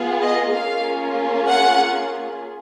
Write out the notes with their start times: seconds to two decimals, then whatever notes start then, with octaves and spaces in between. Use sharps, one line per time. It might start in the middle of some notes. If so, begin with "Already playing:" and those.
Already playing: B3 F4 G#4
0.22 D#5
0.52 A#3 C#4 F4 G#4 F5
1.46 F#5